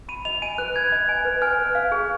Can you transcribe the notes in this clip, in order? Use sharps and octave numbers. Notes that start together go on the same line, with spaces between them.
B5 D#7
D#5 F7
G#5 D#7
B4 F#6
B5 G#6
D#5
G#5
B4
G#5 F6
B4
F5
G#4